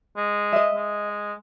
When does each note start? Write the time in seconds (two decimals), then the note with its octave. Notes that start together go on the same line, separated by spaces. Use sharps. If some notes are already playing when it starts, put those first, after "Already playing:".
0.17 G#3
0.53 D#5 E5
0.75 G#3